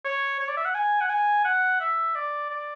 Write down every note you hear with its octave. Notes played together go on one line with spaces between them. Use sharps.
C#5
C#5
D5
E5
F#5
G#5
F#5
G#5
F#5
E5
D5
D5